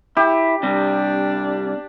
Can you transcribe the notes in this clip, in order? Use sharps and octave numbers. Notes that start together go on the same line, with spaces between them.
E4 G4
C3 G3 D4